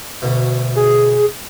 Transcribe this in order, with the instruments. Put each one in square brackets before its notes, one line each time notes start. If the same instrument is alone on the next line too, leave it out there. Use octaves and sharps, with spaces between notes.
[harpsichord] D2 B2
[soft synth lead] G#4